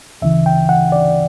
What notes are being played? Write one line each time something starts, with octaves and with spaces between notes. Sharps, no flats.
D2 C#3 E3 E5
G5
F#5
D5